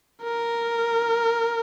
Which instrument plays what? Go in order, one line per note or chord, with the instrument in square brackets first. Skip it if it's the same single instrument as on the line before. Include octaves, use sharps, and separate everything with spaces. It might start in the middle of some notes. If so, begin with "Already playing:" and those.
[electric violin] A#4